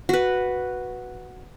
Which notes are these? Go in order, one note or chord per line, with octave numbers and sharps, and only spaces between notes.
F#4 B4